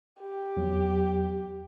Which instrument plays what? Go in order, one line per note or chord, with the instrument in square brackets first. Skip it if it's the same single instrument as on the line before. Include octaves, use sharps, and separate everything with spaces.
[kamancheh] G4
[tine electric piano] E2 F#3